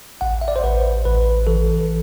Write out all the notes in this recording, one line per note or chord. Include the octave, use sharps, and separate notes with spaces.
A1 F#5
E5
D5
C5
A1 B4
A1 B4
E3 A4